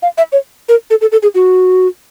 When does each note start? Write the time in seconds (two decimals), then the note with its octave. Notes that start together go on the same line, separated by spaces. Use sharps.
0.02 F5
0.18 E5
0.32 C#5
0.69 A#4
0.90 A4
1.01 A4
1.12 A4
1.23 G#4
1.35 F#4